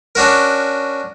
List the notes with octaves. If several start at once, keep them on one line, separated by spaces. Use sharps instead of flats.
C#4 D4 F#4 A#4